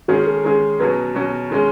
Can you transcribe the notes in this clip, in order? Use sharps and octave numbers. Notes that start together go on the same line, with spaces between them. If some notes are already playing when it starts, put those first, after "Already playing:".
D#3 G#3 C#4 F#4 G#4
A4
D#3 G#3 C#4 G#4
B2 F#3 C#4 B4
B2 F#3 C#4
D#3 G#3 C#4